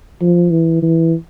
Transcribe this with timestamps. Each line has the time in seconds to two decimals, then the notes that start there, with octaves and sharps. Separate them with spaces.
0.21 F3
0.51 E3
0.82 E3